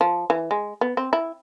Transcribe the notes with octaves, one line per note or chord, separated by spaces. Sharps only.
F3
E3
G#3
B3
C4
E4